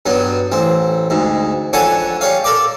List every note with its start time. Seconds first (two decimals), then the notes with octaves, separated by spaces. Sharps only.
0.06 G2 F#3 B3
0.52 A1 C4
1.10 D2 G#2
1.73 F2 D4 A4 C#5 F#5 G#5
2.21 G3 C#5 F5
2.44 A4 A#4 D5 D6